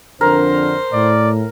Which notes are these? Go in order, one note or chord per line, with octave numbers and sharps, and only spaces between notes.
F2 D3 D4 A#4 C5
A2 D5